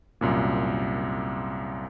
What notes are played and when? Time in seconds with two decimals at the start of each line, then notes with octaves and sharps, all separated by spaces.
0.21 C2 F#2 A#2